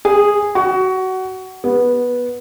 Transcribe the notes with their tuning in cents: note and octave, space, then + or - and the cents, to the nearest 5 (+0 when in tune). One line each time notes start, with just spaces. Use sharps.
G#4 -10
F#4 +20
B3 -10